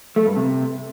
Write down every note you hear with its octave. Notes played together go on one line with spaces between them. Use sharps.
A3
G2
C3